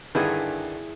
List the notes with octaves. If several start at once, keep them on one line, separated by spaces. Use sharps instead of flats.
G2 D3 D#3 E4 G#4